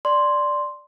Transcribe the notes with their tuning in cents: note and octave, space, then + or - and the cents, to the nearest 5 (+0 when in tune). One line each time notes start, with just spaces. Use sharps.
D5 +0 C6 +0